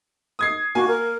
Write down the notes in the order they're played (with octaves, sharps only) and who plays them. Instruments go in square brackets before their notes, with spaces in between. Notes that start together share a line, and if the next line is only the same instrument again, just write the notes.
[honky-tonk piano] D#6 G#6 C7
[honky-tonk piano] A#3 G#5 [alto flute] F#4
[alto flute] A#4